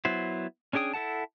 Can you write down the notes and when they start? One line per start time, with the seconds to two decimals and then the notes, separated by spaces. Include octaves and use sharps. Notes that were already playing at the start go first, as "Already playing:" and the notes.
0.05 F#3 B3 E4 C5
0.73 C#4 D4 G#4 G5 D#6
0.94 E4 A4 F#5 A5